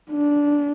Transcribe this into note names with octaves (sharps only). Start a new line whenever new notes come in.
D4